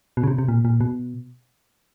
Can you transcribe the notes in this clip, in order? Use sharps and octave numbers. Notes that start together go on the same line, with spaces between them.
B2
C#3
C3
C3
A#2
A#2
B2